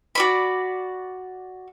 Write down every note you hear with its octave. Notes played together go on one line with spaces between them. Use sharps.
F#4 D5 B5